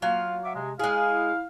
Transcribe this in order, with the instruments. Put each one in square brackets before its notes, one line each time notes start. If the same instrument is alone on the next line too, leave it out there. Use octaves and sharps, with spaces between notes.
[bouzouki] F#3 F5 [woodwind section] A#3 F4
[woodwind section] E5 F#5 D6
C3 G#3
[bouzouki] G#3 G#4 [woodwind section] E4 F5